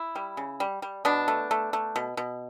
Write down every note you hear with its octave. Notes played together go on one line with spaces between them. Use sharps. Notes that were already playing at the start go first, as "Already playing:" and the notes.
Already playing: E4
G3
C#3
G3
G3
B2 B3 D4
A3
A3
A3
B2
B2